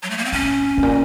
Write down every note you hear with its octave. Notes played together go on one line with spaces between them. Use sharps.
F#3
A3
A#3
C4
A2 C#4
A2
A#2